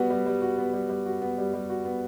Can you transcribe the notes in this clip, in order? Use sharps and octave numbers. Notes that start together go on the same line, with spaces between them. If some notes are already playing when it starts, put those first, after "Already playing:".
Already playing: G3 B3 F#4
G3
G3
F#4
B3
G3
G3
F#4
B3
G3
G3
F#4
B3